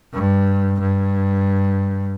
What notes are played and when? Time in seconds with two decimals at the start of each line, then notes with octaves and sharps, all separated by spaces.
0.14 G2
0.80 G2